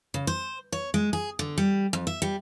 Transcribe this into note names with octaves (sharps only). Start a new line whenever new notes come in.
C#3
C5
C#5
G#3
G#4
D3
G3
F2
E5
G3